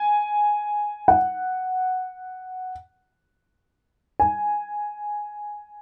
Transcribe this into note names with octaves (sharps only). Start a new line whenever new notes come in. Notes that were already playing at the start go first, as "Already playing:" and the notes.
Already playing: G#5
F#5
G#5